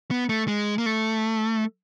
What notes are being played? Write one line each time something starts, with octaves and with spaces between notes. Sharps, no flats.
B3
A3
G#3
A#3
A3